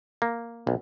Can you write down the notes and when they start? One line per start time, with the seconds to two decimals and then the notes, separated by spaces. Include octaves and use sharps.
0.22 A#3
0.67 B1